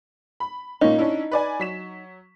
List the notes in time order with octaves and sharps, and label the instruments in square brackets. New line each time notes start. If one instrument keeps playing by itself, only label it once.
[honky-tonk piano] B5
[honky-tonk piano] A#2 A#3 C#4 [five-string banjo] D#4
[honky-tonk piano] C#4 D4 E4
B4 D5 G#5
F#3 B6 E7